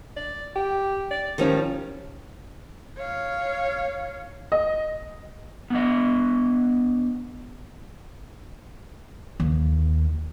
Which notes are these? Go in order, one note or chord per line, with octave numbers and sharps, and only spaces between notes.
D5
G4
D5
D#3 F3 G3 C#4
C#5 F5
D#5
B3 D4 D#5
D#2